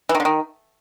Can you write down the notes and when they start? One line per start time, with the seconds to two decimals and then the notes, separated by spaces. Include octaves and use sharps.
0.09 E3
0.15 D#3
0.20 D3
0.25 D#3